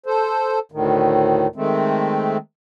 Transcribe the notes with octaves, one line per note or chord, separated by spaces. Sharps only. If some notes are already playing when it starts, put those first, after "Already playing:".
A4 C5
D2 A2 D#3
D#3 G#3 A3 C4